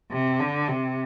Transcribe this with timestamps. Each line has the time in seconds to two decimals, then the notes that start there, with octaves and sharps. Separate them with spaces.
0.12 C3
0.40 D3
0.68 C3